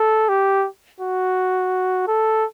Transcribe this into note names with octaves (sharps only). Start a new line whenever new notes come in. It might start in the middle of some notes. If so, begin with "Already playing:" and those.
Already playing: A4
G4
F#4
A4